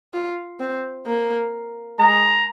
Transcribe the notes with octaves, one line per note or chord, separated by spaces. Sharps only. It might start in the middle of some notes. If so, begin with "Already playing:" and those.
F4
C4
A#3
G#3 A#5